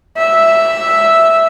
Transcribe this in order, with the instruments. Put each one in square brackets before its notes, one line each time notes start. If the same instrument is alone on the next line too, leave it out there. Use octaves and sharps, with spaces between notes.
[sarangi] E5